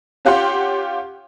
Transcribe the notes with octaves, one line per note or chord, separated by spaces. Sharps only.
C#4 F4 G4 F#5 C6